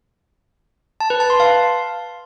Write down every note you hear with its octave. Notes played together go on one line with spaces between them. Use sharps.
A5
B4
A5
C6
F5